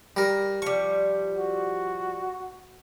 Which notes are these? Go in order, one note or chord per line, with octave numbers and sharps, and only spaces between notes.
G3 A#4
F3 G3 C#6
F#4